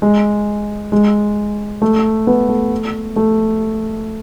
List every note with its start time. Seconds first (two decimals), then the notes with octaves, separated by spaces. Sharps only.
0.02 G#3
0.92 G#3
1.82 A3
2.27 B3
2.49 A3
3.16 A3